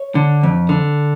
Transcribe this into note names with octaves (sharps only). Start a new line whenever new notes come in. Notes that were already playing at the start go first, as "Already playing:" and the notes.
Already playing: C#5
D3
F2
D3